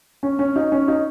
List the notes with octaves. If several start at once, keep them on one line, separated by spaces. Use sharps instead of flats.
C#4
C#4
D#4
C#4
D#4